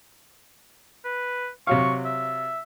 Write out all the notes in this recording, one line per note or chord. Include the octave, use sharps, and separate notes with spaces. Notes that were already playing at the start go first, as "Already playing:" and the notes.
B4
C3 F#3 F5 C#6
E5